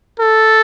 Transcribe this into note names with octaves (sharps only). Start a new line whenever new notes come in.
A4